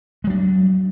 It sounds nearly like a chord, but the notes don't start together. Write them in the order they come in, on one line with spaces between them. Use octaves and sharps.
G#3 F#3 D4